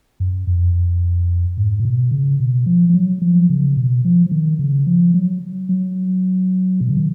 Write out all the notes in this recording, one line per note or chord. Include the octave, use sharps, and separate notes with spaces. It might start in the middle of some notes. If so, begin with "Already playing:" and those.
F#2
F2
G#2
A#2
B2
C#3
B2
F3
F3
F#3
F3
C#3
B2
F3
F3
D#3
C#3
F3
F#3
F#3
B2
C#3
D#3